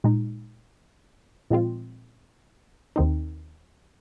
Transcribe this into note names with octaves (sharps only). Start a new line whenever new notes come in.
A#2 G#3 D#4
A#2 F3 G#3 C4 F4
D#2 D#3 C4 D#4